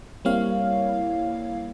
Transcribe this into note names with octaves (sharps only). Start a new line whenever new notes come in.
G3 A#3 C4 E4 C#5 F5